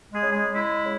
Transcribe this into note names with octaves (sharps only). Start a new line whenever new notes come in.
G#3 G#4
C#3
G#3 G#4
G#3 E4
C#3